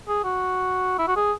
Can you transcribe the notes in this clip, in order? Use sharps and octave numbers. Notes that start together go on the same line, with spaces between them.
G#4
F#4
E4
F#4
G#4